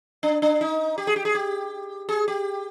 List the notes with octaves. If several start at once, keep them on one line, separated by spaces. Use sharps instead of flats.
D4
D4
D#4
G4
G#4
G4
G#4
G4
G#4
G4